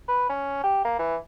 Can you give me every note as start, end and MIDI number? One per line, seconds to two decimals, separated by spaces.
0.08 0.25 71
0.29 0.62 61
0.63 0.84 67
0.84 0.96 58
0.99 1.16 52